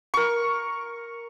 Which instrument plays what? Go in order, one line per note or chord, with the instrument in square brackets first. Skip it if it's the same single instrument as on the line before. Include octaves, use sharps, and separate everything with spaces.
[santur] A#4 C#6